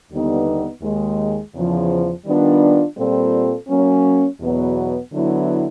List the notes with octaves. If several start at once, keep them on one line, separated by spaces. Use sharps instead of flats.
D#2 D3 G3 B3 D#4
D#2 D#3 G#3
E2 C#3 F3
D#3 G3 B3 D4 F4
A#2 G3 C4 F4 A4
F#3 A#3 C#4
E2 B2 F#3 B3
D3 F#3 B3 E4